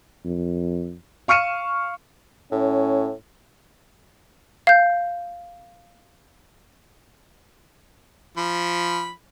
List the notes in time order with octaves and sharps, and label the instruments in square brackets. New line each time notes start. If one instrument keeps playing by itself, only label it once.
[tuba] F2
[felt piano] F5 C#6 F6 C#7 D#7 E7
[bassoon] A2 [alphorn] C#4
[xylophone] F5 G6
[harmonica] F3 B5